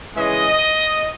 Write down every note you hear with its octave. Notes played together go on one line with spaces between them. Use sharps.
C#3 E3 G#3 D#5